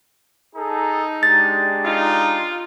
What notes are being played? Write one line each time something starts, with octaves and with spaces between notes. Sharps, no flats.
D#4 G#4 A4 A#5
G#3 D4 G4 A6
D#4 F4